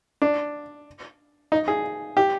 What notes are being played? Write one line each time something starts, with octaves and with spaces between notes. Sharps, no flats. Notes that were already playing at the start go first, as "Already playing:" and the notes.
D4
D#4
G#4
G4